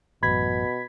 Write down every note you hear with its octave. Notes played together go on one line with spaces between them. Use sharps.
A1 F#2 B2 B5 G#6 B6